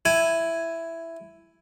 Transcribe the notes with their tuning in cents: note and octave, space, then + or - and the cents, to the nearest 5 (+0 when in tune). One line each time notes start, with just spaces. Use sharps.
E4 +5 G#5 +0